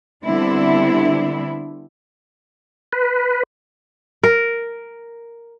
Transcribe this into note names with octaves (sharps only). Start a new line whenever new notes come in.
D3 G3 B3 C4 D4 E4
B4
A#4